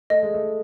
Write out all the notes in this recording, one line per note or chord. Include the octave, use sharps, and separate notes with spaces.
A3 D#5
G#3
A3